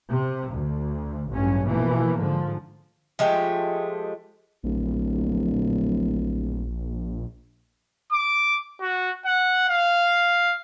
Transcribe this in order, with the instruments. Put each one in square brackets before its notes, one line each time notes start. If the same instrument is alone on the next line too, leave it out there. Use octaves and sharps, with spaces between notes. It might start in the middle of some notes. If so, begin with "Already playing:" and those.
[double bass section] C3
D2
A1 G2 F#3 C#4
B2 E3 F3 A#3
G#2 D3 F3
[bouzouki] F3 G#3 A3 G4
[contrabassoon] D1 [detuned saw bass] A#1
[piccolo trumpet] D6
F#4
F#5
F5